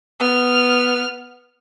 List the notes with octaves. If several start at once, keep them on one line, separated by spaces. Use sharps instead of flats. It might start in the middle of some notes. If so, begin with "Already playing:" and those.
B3 F6